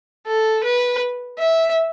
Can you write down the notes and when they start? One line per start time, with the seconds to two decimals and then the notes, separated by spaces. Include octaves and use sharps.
0.27 A4
0.64 B4
1.38 E5